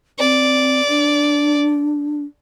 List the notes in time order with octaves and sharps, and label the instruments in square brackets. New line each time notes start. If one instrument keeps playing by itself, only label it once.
[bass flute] C4 [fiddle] D5
[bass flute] D4